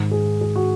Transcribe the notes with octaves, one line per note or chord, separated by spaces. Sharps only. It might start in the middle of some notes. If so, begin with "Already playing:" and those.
Already playing: G#2 D#3
G#4
G#4
F#4